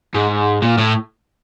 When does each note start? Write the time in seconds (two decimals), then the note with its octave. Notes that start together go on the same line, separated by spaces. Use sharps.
0.15 G#2
0.62 A#2
0.78 A2